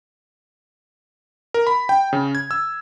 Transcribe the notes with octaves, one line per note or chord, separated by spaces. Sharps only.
A#4
B5
G5
C#3
G#6
E6